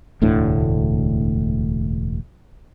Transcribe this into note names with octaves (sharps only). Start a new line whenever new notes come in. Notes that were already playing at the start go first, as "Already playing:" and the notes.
E1 D2 A2 D3